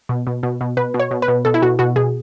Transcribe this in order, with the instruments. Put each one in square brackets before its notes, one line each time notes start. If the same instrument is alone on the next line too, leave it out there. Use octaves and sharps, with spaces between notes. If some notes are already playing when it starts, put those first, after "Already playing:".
[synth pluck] B2
B2
B2
B2
B2 B4
B2
C#5
B2
B4
B2
B2 A4
E4
B2 F#4
B2 F#4
B2 G#4